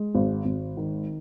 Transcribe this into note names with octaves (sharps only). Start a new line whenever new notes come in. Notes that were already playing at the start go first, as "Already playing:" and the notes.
Already playing: G#3
G#1
G#1
D#3